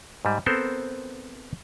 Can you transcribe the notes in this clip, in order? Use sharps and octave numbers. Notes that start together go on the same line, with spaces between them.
G#2 G3
B3 C4 A4 A#4 C5